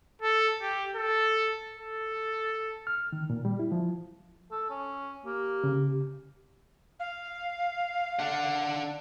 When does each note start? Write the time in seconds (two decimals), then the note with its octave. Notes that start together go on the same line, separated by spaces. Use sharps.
0.22 A4
0.62 G4
0.96 A4
1.77 A4
2.87 F6
3.12 D#3
3.30 A#2
3.45 G3
3.59 E4
3.72 F3
4.51 A4
4.70 C#4
5.25 A#3 G4
5.64 C#3
7.00 F5
8.19 D4 F#5